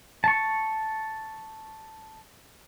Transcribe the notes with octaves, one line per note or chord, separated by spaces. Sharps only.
A5 C#6